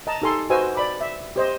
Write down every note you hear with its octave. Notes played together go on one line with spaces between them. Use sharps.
D#5 A5 A#5
D#4 G4 A4 G#5 C6
F#4 B4 C5 D#5 G#5 E6
D5 B5 D6
E5
G4 C5 D#5